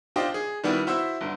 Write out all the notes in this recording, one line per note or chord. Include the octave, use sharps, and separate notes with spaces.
D4 F4 G4 C5 D#5
G#4
D#3 G3 B3 D4 E4 F#4
E4 F#4 C5 E5 E6
G1 D3